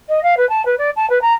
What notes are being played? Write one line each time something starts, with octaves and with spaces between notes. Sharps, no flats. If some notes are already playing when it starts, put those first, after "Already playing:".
D#5
F5
B4
A5
B4
D5
A5
B4
A#5